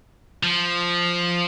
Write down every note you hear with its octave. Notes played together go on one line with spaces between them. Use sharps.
F3